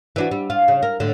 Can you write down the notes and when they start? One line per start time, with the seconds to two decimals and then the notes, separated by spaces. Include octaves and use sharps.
0.16 E3 D4 F#4
0.31 G3
0.50 F4
0.68 C#3
0.83 A#4
1.00 A2 D3